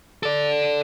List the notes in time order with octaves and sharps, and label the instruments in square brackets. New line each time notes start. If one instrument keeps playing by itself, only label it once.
[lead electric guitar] A4 D5